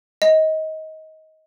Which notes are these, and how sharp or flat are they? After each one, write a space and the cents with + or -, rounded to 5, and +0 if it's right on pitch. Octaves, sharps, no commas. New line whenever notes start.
D#5 +20